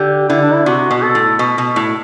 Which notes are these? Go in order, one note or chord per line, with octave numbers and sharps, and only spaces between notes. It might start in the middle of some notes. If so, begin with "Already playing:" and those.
Already playing: D3 G4
D3 E4
D4
E4
C3 F#4
B2
A4
A2
B2
B2
A2